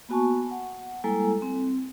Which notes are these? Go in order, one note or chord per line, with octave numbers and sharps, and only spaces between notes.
A#3 B3 F#4 G#5 A5 C#6
F#5
G3 G#3 A#3 E4 A4 G#5
C4